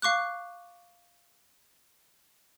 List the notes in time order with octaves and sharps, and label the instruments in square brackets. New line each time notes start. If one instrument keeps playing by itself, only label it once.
[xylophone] F5 C#6 D6 F#6